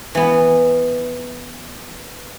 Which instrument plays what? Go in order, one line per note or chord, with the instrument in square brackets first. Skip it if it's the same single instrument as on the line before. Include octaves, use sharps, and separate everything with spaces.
[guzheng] E3 B3